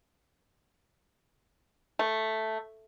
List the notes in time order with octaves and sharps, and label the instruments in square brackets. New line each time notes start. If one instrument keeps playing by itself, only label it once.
[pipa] A3